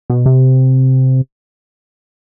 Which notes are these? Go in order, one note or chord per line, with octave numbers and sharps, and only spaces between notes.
B2
C3